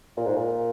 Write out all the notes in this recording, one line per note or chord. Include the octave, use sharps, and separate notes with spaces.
A#2
G#2
A#2